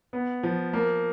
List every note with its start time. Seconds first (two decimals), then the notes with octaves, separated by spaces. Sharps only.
0.13 B3
0.43 F3
0.73 A#3